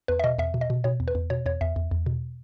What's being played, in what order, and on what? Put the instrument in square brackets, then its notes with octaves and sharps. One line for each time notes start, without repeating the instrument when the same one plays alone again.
[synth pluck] E2 B4
E5
B2 D#5
E2 E5
B2
D#5
B2
B2 C#5
E2
B4
E2
B2 C#5
E2 C#5
E2 E5
E2
E2
B2